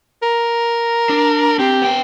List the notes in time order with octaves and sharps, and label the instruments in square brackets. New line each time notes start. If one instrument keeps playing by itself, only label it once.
[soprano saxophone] A#4
[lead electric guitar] D4
[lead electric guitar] C4 [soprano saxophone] G4
[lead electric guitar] B3 G5